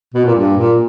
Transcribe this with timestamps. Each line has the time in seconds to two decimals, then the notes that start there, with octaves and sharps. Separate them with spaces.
0.14 B2
0.25 A#2
0.35 G2
0.57 A#2